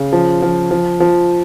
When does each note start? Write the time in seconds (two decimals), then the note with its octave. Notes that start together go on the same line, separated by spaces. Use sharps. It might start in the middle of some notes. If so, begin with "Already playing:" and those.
Already playing: C#3
0.13 F3
0.42 F3
0.71 F3
1.00 F3